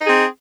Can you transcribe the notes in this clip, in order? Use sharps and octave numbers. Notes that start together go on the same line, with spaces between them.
C4 D#4 G#4